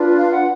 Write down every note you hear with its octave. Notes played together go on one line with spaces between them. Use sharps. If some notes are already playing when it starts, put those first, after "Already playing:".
Already playing: D4 F4 B4
F5
F#5